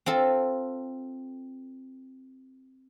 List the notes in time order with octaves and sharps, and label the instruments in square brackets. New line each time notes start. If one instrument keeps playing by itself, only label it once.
[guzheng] C4 F4 A4